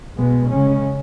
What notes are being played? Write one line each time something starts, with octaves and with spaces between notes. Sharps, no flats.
B2 G#3 B3
C#3 G#3 C#4